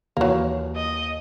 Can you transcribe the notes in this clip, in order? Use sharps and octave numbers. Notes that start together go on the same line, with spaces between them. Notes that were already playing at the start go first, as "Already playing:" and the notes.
D#2 E3 F#3 A#3
D#5